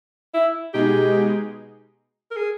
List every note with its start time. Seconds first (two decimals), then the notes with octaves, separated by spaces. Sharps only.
0.34 E4
0.74 B2 G#3 D#4 G4 G#4
2.31 A#4
2.36 G#4